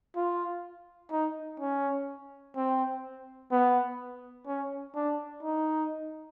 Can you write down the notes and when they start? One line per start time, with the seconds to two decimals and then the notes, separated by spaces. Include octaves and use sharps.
0.16 F4
1.11 D#4
1.60 C#4
2.56 C4
3.51 B3
4.47 C#4
4.95 D4
5.43 D#4